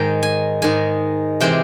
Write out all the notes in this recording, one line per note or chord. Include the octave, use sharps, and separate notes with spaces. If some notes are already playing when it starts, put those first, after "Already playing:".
Already playing: G#2 D#3 G#3 G5
G#5
G#2 D#3 G#3 G#5
C3 E3 G#3 C4 G5